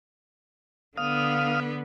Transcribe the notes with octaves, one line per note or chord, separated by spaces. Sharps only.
D3 B3 F5 D#6 F6